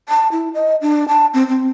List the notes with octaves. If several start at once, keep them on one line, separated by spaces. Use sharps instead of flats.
A5
E4
D#5
D4
A5
C4
C4